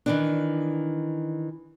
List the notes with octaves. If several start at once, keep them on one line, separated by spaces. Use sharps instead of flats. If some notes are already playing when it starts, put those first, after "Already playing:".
D#3 E3 D4